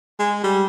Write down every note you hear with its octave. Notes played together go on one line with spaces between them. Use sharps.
G#3
G3